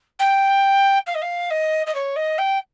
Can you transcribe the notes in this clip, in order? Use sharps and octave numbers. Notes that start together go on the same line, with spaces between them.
G5
F5
D#5
F5
D#5
D#5
C#5
D#5
G5